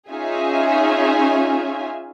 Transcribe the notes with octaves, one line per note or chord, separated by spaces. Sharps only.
C#4 D#4 F4 G#4 E5 G#5